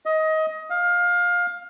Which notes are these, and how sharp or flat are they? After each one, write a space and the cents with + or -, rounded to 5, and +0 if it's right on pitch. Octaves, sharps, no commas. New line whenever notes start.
D#5 +20
F5 +20